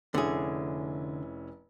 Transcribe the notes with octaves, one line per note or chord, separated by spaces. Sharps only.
F1 D3 C#4 E4 G#4